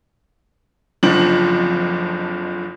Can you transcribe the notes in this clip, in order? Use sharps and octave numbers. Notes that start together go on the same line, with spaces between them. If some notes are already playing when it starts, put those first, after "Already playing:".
F#1 F2 D3 F3 F#7